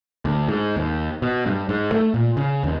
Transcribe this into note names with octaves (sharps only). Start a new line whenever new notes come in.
D2
G#2
D#2
B2
G2
G#2
A3
A#2
C#3
D#2